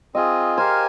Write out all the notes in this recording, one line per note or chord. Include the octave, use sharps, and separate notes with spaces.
C4 F4 G#4 D#5
G4 A#4 C5 F5 G#5